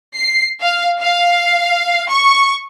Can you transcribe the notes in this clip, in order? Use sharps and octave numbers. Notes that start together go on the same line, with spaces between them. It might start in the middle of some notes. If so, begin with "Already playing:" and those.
C7
F5
F5
C#6